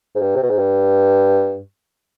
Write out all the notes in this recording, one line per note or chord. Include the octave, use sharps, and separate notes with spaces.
G#2
G2
C3
B2
G#2
G2